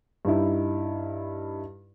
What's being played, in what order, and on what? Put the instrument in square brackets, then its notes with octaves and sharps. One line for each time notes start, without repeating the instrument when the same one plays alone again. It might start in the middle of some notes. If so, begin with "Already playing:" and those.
[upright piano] G2 D#4 E4